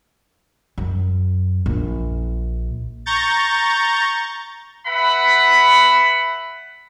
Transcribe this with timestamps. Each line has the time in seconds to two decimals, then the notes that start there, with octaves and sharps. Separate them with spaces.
0.78 F#2
1.66 A#1
3.06 A#5 C#6 G6 A6
4.87 B4 E5 F#5 B5